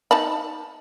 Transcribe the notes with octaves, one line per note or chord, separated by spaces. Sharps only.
D#4 A5 B5